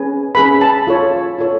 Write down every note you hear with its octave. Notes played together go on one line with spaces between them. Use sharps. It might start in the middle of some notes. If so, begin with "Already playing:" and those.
Already playing: C#4 G#4 B4 G#5
C#4 G#4 B4 B5
A5
F4 A4 C#5
F4 A4 C#5